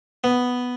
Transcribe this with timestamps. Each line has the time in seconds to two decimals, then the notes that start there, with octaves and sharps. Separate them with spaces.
0.24 B3